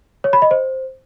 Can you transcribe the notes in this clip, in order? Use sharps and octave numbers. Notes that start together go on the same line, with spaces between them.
C#5
B5
D#5
C5